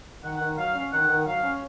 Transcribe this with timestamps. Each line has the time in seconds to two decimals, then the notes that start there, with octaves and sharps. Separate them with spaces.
0.23 D#3 F#5
0.41 D#3
0.58 F#3 F5
0.75 C#4
0.92 D#3 F#5
1.09 D#3
1.26 F#3 F5
1.43 C#4